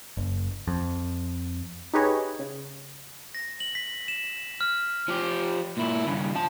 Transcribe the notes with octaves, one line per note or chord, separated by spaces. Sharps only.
F#1
F2
D#4 G4 G#4 B4 C#5 D#5
C#3
A#6
F#7
B6
E7
F6
F3 G4
A#2 E4
G2 C#3
F3 A5